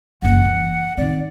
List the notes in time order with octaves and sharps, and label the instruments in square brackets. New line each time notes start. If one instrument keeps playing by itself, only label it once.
[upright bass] F#1 E3 [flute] F#5
[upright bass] E3
[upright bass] D#3 C4 [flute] D5